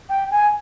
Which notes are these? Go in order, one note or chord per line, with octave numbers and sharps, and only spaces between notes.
G5
G#5